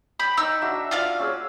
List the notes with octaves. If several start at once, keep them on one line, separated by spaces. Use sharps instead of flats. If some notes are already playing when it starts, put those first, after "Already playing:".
G5 B5
D#4 E6
D4 F#4 E5
F4 D5 F5
C#4 G#4 E6